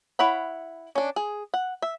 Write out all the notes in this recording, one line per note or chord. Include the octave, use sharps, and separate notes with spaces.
E4 C#5 F#5 B5
C#4 D4
G#4
F#5
E5